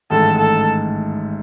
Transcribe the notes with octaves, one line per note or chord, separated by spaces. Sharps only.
A1 G#2 D#3 A3 A4
A4